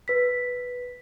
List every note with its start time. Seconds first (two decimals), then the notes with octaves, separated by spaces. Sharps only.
0.08 B4 B6